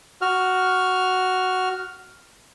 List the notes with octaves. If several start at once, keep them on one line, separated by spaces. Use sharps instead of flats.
F#4 F6